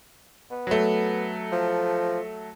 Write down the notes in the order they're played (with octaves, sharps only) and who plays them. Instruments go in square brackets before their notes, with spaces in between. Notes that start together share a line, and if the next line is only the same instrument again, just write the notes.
[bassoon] B3
[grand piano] F#3 A3
[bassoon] F3